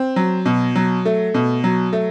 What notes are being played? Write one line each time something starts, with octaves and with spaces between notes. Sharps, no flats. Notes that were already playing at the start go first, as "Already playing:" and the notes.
Already playing: C4
F#3
B2
F#3
A3
B2
F#3
A3